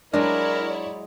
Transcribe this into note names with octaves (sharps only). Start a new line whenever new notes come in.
F#3 G#3 D4 E4 A#4 C#5 D5